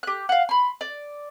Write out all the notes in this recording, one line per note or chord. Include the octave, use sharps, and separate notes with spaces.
G4 F#6
F5 F#5
B5 C6
D5